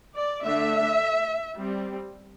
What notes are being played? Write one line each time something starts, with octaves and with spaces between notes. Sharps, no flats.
D5
D3 A3 D4 E5
G3 C4